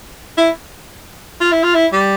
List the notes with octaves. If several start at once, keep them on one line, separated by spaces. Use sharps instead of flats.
E4
F4
E4
F4
E4
G3